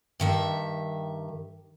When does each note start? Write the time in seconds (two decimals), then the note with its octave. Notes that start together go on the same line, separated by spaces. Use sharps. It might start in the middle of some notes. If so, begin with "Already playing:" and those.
0.20 G2 D#3 E5